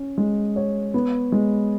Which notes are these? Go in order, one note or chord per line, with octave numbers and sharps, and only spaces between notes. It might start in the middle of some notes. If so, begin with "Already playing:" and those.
Already playing: C#4
G#3
C#5
B3
G#3